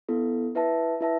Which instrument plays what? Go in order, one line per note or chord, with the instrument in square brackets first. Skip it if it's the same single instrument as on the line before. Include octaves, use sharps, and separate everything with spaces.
[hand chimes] B3 E4 A4
E4 B4 E5 A5
E4 B4 E5 A5